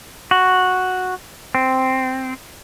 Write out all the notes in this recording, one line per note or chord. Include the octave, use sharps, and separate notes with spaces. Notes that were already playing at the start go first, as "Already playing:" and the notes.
F#4
C4